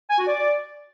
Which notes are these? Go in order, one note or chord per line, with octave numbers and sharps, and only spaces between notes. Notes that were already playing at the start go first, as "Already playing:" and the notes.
G#5
F#4
D5